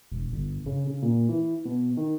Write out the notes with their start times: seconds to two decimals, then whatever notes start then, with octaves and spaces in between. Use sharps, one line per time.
0.11 E1
0.32 G1
0.66 C#3
0.87 C#3
1.02 A#2
1.29 E3
1.65 B2
1.97 D#3